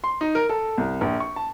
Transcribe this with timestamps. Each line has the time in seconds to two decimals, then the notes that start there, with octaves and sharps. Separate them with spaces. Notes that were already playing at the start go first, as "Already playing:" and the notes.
0.04 C6
0.21 D#4
0.35 A#4
0.49 A4
0.78 C2
1.01 A#1
1.20 C#6
1.36 A5